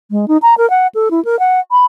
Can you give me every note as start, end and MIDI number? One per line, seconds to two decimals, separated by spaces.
0.11 0.25 56
0.28 0.37 63
0.42 0.54 82
0.58 0.69 70
0.70 0.87 78
0.95 1.09 69
1.11 1.23 64
1.25 1.39 70
1.39 1.60 78
1.71 1.86 83